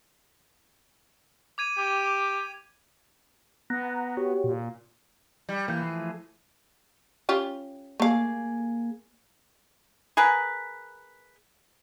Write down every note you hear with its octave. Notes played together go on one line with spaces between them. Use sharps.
D6 G#6 D#7
G4
B3 F#5 A#5
F#4 G4 C#5
A#2
G3
E3 A#3 G6
F3 A3 G#4
C#4 F4 G4
A3 A#3 G#4 F5
G#4 A#4 B4